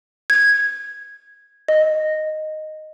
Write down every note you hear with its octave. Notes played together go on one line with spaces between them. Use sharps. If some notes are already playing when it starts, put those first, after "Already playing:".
G#6
D#5